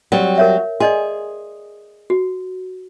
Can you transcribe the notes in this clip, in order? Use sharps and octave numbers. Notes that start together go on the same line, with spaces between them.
F#3 G3 C4
A#4 C#5 E5
G#4 D5 D#5 C6
F#4